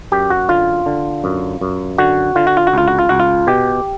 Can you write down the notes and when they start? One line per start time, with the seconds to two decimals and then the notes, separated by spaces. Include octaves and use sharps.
0.12 F#2 G4
0.30 F#4
0.48 D3 F4
0.86 D3
1.24 F#2
1.61 F#2
1.98 D3 F#4
2.35 D3 F4
2.47 F#4
2.57 F4
2.67 F#4
2.74 C#2 F4
2.88 F#4
2.99 F4
3.09 C#2 F#4
3.20 F4
3.47 B2 G4